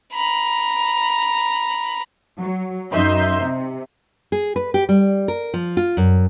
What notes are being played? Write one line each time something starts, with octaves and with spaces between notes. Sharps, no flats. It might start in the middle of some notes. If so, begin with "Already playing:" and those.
A#5 B5
F#3
F#2 D#4 E5 C6 G6
C3
G#4
B4
G4
G3
A#4
F3
F4
F#2